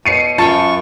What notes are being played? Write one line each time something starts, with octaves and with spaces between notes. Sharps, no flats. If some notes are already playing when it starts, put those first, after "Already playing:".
B2 C7 C#7 D#7
F#2 F4 F5 G5 A5 C#6